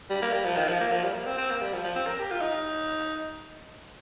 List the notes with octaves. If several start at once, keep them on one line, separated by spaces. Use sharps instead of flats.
G3
A#3
G3
F3
D#3
F3
A#3
F3
G3
A#3
C4
C4
A#3
G3
F3
F3
C4
A#4
G4
F4
D#4